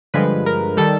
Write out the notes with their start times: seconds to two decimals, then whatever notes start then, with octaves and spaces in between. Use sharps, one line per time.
0.14 G2 D3 F3 G#3 B4
0.46 A#4
0.77 D#3 G3 A4